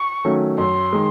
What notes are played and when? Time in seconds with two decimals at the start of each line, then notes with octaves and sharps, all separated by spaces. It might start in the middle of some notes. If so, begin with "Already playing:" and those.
Already playing: C#6
0.25 D#3 F#3 A3 C#4
0.58 F#2 C6
0.93 D#3 G#3